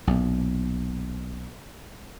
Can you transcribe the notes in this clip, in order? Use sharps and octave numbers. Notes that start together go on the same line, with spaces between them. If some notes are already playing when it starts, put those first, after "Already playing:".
B1 A#2